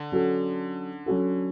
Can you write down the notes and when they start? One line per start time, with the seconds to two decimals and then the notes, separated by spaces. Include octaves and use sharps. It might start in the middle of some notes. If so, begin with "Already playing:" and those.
Already playing: D3
0.12 F#3 C#4 F#4 A4
1.06 F#3 C#4 F#4 A4